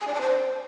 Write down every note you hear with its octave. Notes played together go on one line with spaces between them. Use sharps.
G#5
D5
A5
C5